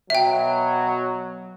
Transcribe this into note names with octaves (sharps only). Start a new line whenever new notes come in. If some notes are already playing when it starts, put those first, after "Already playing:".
B2 F#3 E5 G5